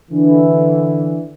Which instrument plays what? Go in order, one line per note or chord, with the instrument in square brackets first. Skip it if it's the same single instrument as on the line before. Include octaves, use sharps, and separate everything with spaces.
[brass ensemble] D3 E3